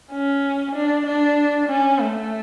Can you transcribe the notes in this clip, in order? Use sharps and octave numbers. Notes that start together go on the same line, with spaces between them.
C#4
D4
D4
C#4
A3